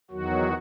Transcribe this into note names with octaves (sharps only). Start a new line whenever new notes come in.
E2 D#3 F#3 F#4